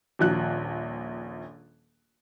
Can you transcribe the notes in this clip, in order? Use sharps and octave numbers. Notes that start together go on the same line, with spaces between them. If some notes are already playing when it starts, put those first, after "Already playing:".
D#1 A#1 F#6